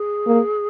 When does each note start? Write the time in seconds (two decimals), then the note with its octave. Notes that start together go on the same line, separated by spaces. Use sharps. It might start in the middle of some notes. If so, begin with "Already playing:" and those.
Already playing: G#4
0.27 A#3